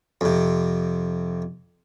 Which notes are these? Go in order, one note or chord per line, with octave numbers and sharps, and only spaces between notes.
F2 C3